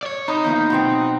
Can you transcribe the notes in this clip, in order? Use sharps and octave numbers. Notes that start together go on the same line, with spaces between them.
C#5 D5
C3 D#4 A#5 B5 D#6
E3 F3 A#3 B3 E4 G6
B2 F#3 C4 F#5 C6